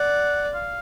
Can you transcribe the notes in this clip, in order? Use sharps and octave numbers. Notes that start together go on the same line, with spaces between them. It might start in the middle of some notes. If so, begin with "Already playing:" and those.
Already playing: D5 F#5
F5